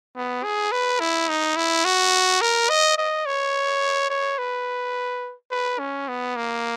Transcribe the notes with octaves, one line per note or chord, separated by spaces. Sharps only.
B3
G#4
B4
E4
D#4
E4
F#4
A#4
D#5
D#5
C#5
C#5
B4
B4
C#4
B3
A#3